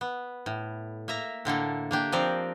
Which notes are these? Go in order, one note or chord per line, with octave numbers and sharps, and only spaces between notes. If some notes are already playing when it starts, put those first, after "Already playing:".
B3
A2
A#3 E5 A#5
A2 D3 A#3 A4
A#3 D4 G4
F3 C4 A#4 D5